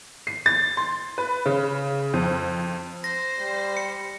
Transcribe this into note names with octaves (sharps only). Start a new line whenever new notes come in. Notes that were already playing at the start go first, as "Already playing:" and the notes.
C7
A6
C6
B4
C#3
F2
C5 A#6
G3
C#7